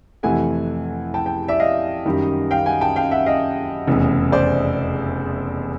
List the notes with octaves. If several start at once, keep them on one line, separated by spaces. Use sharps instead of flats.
F2 C3 E3 A3 F#5 G#5
G5 A5
G5 A5
D5 E5
D#5 F5
F#2 D#3 G3
F5 G5
F#5 G#5
G5 A5
F5 G5
E5 F#5
D#5 F5
F1 E2 C#3
C5 D5